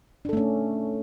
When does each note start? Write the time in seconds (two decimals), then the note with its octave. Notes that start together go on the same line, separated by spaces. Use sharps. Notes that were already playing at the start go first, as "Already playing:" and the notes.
0.25 D4
0.29 A4
0.33 A3
0.37 C#4